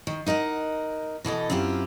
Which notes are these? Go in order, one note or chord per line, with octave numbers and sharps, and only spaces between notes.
D#3
D#4 A#4 D#5 F#5
B2 E3 A4 D#5
F#2 C4 E4 F4 G4